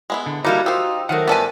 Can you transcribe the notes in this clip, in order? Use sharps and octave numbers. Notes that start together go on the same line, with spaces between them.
G#3 B3 E4
D3
G3 A#3 D#4 E4 F#4 A4 D5
D#4 F4 G4 C5 D#6 E6
D#3 F#3 A3 A#4 C5 E5 F#5
G2 B3 F4 G4 A4 B4 D5 G#5